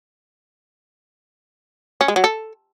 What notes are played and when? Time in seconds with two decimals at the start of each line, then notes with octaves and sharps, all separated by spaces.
2.01 C#4
2.08 G#3
2.16 F#3
2.24 A4